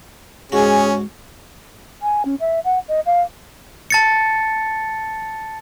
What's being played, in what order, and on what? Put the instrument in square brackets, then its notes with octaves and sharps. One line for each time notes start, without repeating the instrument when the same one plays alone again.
[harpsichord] G#2 F#4 [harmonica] C#4 [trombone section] G#4
[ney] G#5
C#4
E5
F#5
D#5
F5
[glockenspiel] A5 A6 C#7